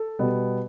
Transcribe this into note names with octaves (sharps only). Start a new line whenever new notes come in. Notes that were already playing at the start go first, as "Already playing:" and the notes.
Already playing: A4
B2 G3 B3